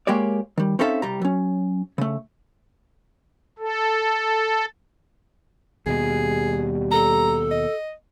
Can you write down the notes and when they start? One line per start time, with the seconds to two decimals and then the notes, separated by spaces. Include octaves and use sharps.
0.07 G#3 A#3 G4 C#5 D5
0.58 D#3 G3
0.79 C4 C#4 D#4 A4 E5 F5
1.02 C2 G3 A#5
1.22 F#3 C#4
1.98 C#3 A3
3.59 A4
5.86 D#2 B2 G3 G#4
6.92 A4 A#5
7.51 D#5